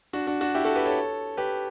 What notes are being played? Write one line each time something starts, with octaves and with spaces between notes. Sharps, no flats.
D4 F#4
D4 F#4
D4 F#4
E4 G4
F#4 A4
G4 B4
A4 C#5
G4 B4